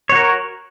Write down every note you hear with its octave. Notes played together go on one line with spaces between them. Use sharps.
F#4 A#4 C#5